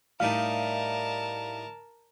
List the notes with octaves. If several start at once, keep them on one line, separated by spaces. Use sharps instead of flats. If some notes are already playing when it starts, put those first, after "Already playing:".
A2 G3 D#4 A#4 F5 A5